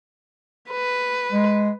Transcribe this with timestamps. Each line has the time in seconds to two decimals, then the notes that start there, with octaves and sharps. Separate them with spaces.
0.70 B4
1.32 G#3